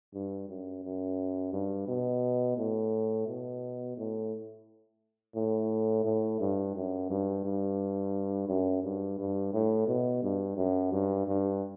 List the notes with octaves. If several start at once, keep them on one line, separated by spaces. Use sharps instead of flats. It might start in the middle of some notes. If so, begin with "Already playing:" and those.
G2
F#2
F#2
G2
B2
A2
B2
A2
A2
A2
G2
F#2
G2
G2
F#2
G2
G2
A2
B2
G2
F#2
G2
G2